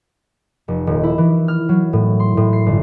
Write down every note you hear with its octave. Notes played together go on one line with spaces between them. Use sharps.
F1
D#1
E4
E3
F6
F#3
A2
C6
A2
C7
G1